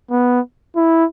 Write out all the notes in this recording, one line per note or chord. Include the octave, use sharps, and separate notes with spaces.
B3
E4